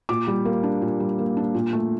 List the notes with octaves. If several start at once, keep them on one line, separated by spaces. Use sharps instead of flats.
A#2 D6
G3
A#3
D4
A#2
G3
A#3
D4
A#2
A3